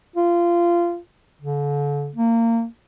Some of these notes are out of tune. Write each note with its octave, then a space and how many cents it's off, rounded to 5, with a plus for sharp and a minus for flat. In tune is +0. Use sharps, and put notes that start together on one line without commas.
F4 -20
D3 -40
A#3 -25